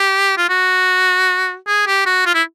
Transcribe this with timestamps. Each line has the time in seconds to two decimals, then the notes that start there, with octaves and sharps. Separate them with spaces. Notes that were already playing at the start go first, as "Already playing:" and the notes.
Already playing: G4
0.37 F4
0.49 F#4
1.67 G#4
1.87 G4
2.06 F#4
2.26 F4
2.34 E4